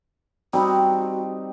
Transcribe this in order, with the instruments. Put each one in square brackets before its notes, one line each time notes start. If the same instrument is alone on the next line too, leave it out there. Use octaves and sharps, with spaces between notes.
[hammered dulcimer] G3 C4 D#4 [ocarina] F#4